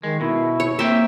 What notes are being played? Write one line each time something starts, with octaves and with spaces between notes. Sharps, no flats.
D#3 G#3
B2 E4
C#5
A#3 C4 E5 G5